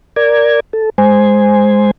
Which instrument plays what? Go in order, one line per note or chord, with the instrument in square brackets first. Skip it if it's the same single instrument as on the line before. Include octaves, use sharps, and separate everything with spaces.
[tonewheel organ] A#4 D5 G#6
A4
G#3 C5 G#5